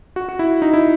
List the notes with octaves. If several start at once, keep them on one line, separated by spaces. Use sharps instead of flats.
F#4
F#4
E4
D#4
E4